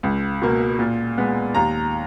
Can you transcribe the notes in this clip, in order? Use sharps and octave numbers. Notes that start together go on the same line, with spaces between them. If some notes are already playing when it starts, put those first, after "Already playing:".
C#2
B2 A#3
A#2
G#3 B3
D#2 A#5